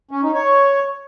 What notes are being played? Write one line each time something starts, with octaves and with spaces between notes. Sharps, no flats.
C#4
D#4
C#5